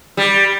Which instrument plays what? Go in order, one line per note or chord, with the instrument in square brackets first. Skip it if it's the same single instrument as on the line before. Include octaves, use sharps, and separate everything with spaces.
[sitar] G3